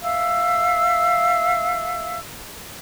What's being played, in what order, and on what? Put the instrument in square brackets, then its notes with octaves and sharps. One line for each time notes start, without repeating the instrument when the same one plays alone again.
[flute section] E5 F5 E6